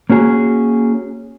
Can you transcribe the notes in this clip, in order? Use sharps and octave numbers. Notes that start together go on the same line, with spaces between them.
A#3 C#4 F#4 G#4